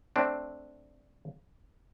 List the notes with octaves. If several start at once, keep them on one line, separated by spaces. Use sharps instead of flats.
A3 C4 D4